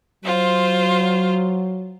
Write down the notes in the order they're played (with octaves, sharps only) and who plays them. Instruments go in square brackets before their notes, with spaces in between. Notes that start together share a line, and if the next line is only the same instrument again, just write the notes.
[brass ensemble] F#3 [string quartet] F4 C5